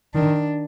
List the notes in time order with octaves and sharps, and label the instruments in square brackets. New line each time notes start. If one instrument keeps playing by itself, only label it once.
[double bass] D#3 [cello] D4